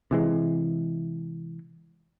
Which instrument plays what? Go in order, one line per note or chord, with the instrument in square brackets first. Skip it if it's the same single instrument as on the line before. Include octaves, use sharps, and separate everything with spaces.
[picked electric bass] C3 E3 G#3